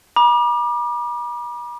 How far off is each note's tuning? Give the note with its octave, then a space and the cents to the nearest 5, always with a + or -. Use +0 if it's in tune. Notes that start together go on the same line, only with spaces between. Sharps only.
B5 -45 D6 +25